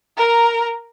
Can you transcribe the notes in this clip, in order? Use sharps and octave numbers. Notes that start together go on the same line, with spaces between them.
A#4 A#5